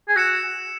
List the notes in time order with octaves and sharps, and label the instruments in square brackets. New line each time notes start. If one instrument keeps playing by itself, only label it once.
[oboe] G#4
[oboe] F#4 [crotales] E6 C#7 E7